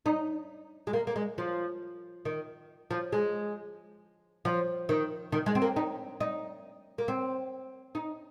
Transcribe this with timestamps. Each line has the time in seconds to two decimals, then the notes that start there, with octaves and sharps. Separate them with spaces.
0.06 D#4
0.87 G#3
0.93 A#3
1.07 A#3
1.16 G#3
1.38 F3
2.25 D#3
2.91 F3
3.12 G#3
4.45 F3
4.89 D#3
5.32 D#3
5.46 G#3
5.55 C4
5.62 A#3
5.76 D#4
6.21 D#4
6.98 A#3
7.08 C4
7.95 D#4